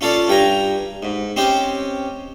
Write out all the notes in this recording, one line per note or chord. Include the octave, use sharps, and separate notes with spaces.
C#4 F4 A4 D5
G2 G5 G#5 A#5
G#2
C4 C#4 G4 D#5